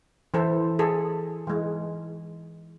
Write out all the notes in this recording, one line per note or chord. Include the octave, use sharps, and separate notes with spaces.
E3 E4 A4 C5
G#4 A4
E3 G#3